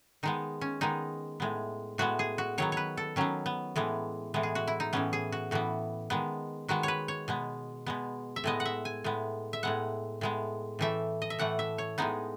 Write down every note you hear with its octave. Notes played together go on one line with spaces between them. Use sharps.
D#3 G#3 B3 D#4
C#4
D#3 G#3 B3 D#4
A2 G#3 B3
A2 G#3 B3 F#4
G#4
F#4
D#3 F#3 B3 C#5
B4 C#5
A4
D#3 F#3 B3 C#4
B3
A2 E3 G#3 B3
A2 E3 G#3 B3
G#4
F#4
E4
D#4
A2 E3 B3 C#4
G#4
F#4
A2 E3 B3 F#4
D#3 G#3 B3
D#3 G#3 B3 F#4
B4 C#5
C#5
B2 G#3 B3
B2 G#3 B3
E5
A2 G#3 B3 D#5
F#5
E5
G#5
A2 G#3 B3
E5
A2 G#3 B3 F#5
A2 G#3 B3
A2 E3 A3 E5
D#5
E5
A2 E3 A3 F#5
E5
C#5
A2 G#3 B3 D#4